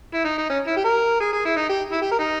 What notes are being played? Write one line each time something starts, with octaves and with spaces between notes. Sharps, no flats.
E4
D#4
D#4
C#4
E4
G4
A#4
G#4
G#4
E4
D#4
G4
E4
G4
A#4
D#4